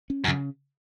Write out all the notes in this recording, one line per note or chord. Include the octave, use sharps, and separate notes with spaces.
C#4
F#2
C#3